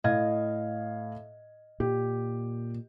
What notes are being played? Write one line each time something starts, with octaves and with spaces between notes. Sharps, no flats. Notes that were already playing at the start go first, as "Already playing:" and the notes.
A2 D#5 F5 G#6
A#2 G4